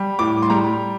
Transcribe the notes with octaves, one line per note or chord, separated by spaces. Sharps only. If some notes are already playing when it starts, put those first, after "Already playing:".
Already playing: G3
A2 D6
C6
G3 A#5